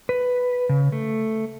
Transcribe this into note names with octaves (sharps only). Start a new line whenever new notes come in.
B4
C#3
A3